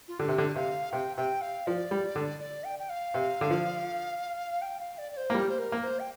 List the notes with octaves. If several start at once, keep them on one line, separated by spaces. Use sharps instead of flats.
F4
D3 G4
C3
D3
C3 F5
C3 G5
C3 G5
F5
F3 D5
G3
D3
D5
G5
G5
F5
C3
D3
F3
G5
F5
D5
D5
C5
A#3
G3 G4
C5
A#4
A#3
C5
G5